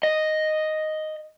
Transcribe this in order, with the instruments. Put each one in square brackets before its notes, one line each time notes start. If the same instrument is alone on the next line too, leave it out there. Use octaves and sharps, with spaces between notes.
[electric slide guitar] D#5